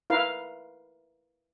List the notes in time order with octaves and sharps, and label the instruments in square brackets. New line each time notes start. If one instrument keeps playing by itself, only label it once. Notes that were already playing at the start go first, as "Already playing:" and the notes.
[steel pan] E4 A#4 B4 F5